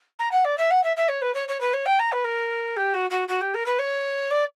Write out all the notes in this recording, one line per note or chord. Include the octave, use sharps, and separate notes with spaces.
A#5
F#5
D5
E5
F#5
E5
E5
C#5
B4
C#5
C#5
B4
C#5
G5
A#5
B4
A#4
G4
F#4
F#4
F#4
G4
A#4
B4
C#5
D5